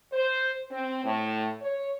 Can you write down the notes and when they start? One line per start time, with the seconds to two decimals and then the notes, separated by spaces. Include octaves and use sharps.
0.13 C5
0.71 C4
1.05 A2
1.62 C#5